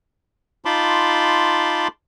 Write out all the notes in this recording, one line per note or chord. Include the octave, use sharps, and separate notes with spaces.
D#4 F4 A5 B5 C6 D6